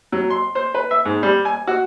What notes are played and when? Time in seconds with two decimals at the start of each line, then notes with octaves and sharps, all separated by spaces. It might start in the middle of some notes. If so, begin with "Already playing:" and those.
0.12 F#3
0.30 C6
0.55 C5
0.74 B4
0.91 E5
1.05 G#2
1.23 G3
1.45 G#5
1.67 F#4